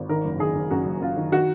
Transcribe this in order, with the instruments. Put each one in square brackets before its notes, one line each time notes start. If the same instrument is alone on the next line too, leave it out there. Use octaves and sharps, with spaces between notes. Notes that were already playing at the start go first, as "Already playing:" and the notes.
Already playing: [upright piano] G#1
D#3 A#4
F#1
D#3 G#4
D#3
F#2 F#4
F#1
F#2 F4
D#3
D#3 F#4